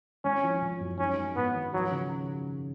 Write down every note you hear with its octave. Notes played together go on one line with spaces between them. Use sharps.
G#1 C#4
F3
G#1
F#2
C#4 D#4
G#3
G#2 B3
D#3
F3 F#3
C#3